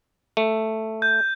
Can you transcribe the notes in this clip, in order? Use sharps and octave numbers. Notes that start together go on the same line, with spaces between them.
A3
G6